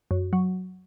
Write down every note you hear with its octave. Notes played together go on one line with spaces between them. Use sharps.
F#2
F#3